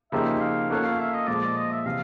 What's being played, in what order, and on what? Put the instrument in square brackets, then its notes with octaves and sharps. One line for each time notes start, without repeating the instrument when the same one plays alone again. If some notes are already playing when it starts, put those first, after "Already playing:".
[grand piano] C#3 F3 A#3 D#4 G4 [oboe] E5
[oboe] F5
[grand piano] A#3 C#4 F4 A4 C#5 [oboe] F#5
[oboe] F5
E5
D#5
[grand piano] A#2 F3 G#3 [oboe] D5
[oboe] D5
D#5
E5
[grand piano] C3 E3 [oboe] F5